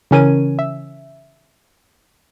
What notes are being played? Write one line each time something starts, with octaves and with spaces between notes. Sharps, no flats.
C#3 E3 C#4 A#4 G#5 D#7
E5